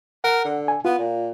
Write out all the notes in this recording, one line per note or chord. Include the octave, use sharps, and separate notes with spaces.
A#4 F#5
D3
G#5
B3 F4
A#2